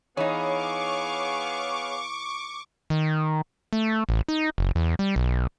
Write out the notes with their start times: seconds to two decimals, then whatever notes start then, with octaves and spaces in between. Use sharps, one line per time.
0.17 E3 B3 D#4 G#4 C#5 F5 C#6 D6
2.90 D#3
3.73 A3
4.09 A1
4.28 D#4
4.58 F#1
4.75 E2
4.99 G3
5.16 B1